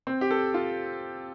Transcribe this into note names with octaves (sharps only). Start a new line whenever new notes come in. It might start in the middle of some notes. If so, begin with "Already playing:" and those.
C4
G4
A4
F4